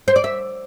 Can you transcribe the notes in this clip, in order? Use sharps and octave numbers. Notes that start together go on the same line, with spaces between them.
C5
D5
E5